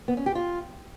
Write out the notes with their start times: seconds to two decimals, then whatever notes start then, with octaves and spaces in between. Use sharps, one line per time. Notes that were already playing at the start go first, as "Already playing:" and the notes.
0.08 B3
0.17 C#4
0.26 G4
0.35 F4